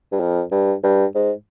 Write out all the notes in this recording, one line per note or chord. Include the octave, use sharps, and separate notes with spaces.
G2
F2
G2
G2
G#2